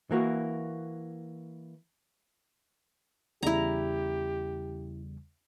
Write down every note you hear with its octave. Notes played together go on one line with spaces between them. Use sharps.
E3 A#3 F#4
E2 C#3 G3 E4 G4 A#5